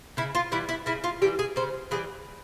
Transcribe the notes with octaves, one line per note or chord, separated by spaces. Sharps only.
C#3 E4
F4
E3 G3 E4
E4
C#3 E4
F4
E3 G3 G4
G#4
C#3 C5
E3 G3 G#4